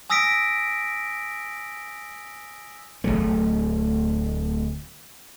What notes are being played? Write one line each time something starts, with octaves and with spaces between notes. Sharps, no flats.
G#5 D#6 E6 A#6 B6 D7
D1 C#2 F#3 A3